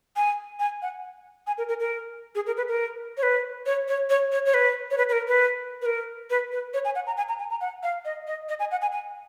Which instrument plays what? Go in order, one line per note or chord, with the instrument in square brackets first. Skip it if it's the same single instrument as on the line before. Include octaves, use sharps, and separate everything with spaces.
[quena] G#5
G#5
F#5
G#5
A#4
A#4
A#4
G#4
A#4
B4
A#4
C#5
B4
C#5
C#5
C#5
C#5
C#5
B4
C#5
B4
B4
A#4
B4
B4
A#4
B4
B4
C#5
G#5
F#5
A#5
G#5
A#5
G#5
A#5
F#5
F5
D#5
D#5
D#5
G#5
F#5
G#5
G#5